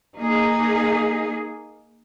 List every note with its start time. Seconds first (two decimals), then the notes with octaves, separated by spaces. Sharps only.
0.17 A#3 D#4 G#4